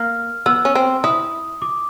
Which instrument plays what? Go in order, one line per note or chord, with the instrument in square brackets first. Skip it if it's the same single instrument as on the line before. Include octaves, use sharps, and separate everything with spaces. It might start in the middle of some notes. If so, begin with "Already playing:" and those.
Already playing: [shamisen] A#3 [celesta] F6
[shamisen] B3 [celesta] E6
[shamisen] C#4
C4
[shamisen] E4 [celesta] D#6
[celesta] D6